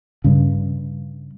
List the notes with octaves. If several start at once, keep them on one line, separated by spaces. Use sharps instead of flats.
G2 C#3